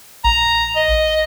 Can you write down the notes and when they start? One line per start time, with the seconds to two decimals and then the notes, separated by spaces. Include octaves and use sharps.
0.24 A#1 A#5
0.76 D#5